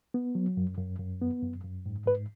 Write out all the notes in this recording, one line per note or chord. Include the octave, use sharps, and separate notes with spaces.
B3
F#3
F#2
F#2
F#2
B3
F#2
F#2
G#2
G#2 B4